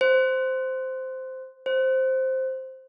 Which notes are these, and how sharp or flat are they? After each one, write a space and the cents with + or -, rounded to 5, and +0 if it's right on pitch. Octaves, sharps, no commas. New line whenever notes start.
C5 -5
C5 +5